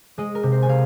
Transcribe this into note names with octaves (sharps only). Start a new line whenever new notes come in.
G#3 D#5
A#4
C3
C5
G#5
C3 F5